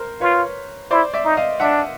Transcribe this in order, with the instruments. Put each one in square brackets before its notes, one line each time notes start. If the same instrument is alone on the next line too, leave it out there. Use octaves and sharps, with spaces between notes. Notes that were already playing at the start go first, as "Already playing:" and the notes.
Already playing: [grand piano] A#4 C5
[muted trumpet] F4 [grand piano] B4 C#5
[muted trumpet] E4 [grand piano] C5 D5
[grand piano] D5 E5
[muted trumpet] D#4
[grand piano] D#5 F5
[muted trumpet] D4 [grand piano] E5 F#5